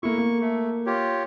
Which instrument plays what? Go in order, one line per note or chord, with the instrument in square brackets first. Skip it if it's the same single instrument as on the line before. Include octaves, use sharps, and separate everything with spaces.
[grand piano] A3 A#3 E4 [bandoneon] C#6
[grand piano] A#3
[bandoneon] A3
F4 G4 C#5